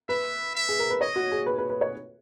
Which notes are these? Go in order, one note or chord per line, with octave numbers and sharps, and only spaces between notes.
B4 E5
E5
G#4
A#4
B4
C#5 D#5
F#4
G#4
B4
B4
B4
C#5